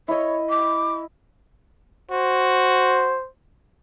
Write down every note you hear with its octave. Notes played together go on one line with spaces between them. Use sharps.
E4 C#5 D#5
D6
F#4 C5